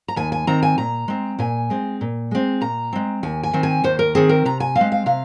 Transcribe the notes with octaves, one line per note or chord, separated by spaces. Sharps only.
A#5
D#2 G#5
G#5
D#3 C4 A#5
G#5
A#2 A#5
G#3 C4
A#2 G#5
G#3 C4
A#2
G#3 C4
A#2 A#5
G#3 C4
D#2 G#5
G#5
D#3 C4
G#5
D#2 C5
A#4
D#3 C4 G#4
A#4
C3 A#5
G#5
C4 F5
G#3
F5
C3 F5